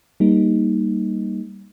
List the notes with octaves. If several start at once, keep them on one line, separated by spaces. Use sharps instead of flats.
G3 A#3 D#4